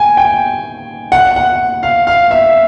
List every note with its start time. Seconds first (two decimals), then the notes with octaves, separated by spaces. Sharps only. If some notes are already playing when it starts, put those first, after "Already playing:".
Already playing: G5 G#5
0.17 G5
1.12 F#5
1.36 F#5
1.83 F5
2.07 F5
2.31 E5